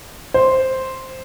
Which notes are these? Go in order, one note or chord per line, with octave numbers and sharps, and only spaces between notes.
C5